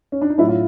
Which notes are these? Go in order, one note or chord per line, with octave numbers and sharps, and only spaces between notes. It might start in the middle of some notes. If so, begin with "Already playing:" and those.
C#4
D4
D#4
A2 F#3 D4 E4
F4